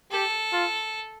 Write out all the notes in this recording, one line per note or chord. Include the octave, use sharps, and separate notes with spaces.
G4 A4
F4